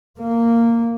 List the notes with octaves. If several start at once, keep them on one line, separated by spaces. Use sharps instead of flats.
A#3